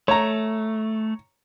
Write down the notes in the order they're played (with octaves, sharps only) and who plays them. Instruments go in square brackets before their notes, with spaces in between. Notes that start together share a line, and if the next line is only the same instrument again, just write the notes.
[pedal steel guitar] A3 [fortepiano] C#5 A#5